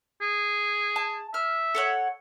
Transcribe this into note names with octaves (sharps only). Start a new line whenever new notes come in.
G#4
A5
E5 F6
A4 C#5 F#5